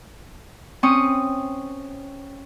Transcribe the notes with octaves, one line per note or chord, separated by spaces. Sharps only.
C4 C#4 C#6 D#6